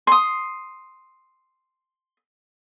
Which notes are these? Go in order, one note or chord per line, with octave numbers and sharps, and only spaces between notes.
C6 D#6